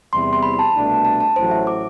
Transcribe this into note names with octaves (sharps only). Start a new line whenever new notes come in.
E2 C3 G3 C4 E4 C6
C6
B5
A5
C2 B2 A3 D4
A5
A5
A1 A2 F#3 C5
E5
D6